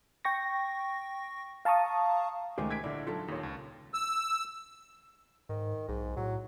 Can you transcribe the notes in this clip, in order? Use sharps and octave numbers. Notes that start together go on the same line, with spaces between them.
G5 C#6 A#6
F5 A5 A#5 C#6 D#6
C#2 D#3 A3 G4 C5 G#5
G#6 B6 D7
A#1 D3 E4 D5
F#3 D#4 F4 A4
D#2 A#2 D#4 C#5
C#2
E6
G#2 D#3
B1 G#2
A2 F#3